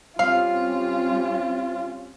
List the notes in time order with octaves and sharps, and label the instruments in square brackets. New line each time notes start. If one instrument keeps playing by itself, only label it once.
[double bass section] G3 C4 C#4 [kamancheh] F4 [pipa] F5